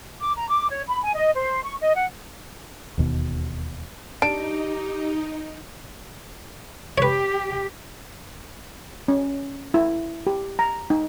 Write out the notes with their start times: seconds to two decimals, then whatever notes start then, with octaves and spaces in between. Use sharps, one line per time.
0.20 D6
0.37 A#5
0.48 D6
0.70 C#5
0.88 B5
1.02 G#5
1.14 D#5
1.34 C5
1.64 C#6
1.81 D#5
1.95 F#5
2.98 E1 D#2 B2
4.22 D4 D#4 G4 D7
6.98 G4 B4 C#5
9.08 C#4
9.74 E4
10.27 G4
10.59 A#5
10.90 D#4